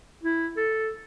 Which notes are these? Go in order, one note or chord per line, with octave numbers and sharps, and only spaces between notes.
E4
A4